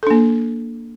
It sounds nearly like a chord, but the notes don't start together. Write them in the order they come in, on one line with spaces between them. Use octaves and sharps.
A4 D4 A#3